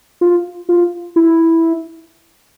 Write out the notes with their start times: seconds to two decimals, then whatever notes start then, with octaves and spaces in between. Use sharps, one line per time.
0.21 F4
0.69 F4
1.16 E4